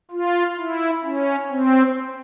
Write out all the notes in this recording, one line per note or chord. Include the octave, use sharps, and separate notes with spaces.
F4
E4
C#4
C4